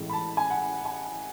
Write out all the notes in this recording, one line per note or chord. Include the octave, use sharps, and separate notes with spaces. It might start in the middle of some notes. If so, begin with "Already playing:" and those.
Already playing: A1 A2 G#3
B5
A5
G#5
F#5
G#5